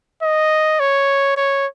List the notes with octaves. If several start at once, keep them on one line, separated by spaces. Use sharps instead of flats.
D#5
C#5
C#5